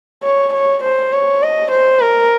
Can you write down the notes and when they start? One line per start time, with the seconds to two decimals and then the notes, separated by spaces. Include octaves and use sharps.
0.24 C#5
0.53 C#5
0.83 C5
1.13 C#5
1.43 D#5
1.72 C5
2.01 A#4